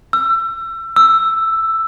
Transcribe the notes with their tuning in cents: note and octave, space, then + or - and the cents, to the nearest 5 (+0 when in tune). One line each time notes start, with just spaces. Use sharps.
E6 +30
E6 +5